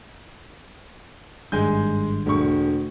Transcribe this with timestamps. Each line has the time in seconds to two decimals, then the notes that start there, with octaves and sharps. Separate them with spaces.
1.52 G#1 G2 G#3 G#5 G6
2.26 E1 D2 C#6